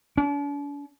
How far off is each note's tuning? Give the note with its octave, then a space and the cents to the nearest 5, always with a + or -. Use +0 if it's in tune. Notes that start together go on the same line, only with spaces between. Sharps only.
D4 -45